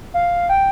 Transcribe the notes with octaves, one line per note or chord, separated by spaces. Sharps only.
F5
G5